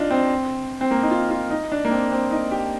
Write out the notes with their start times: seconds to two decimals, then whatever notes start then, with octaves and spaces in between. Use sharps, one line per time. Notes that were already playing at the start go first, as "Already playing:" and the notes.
Already playing: D4 D#4 F4
0.11 C4
0.81 C4
0.91 A#3
1.03 D#4
1.11 F4
1.31 F4
1.50 D#4
1.72 D4
1.85 A#3
1.91 C4
2.12 C4
2.31 D#4
2.51 G4